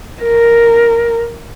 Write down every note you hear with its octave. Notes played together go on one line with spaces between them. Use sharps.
A#4